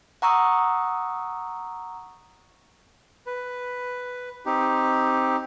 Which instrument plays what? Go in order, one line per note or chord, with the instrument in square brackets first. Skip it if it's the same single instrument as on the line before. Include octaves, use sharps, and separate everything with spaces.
[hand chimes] F#5 A#5 C#6 D#6 E6
[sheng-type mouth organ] B4
C4 D#4 G4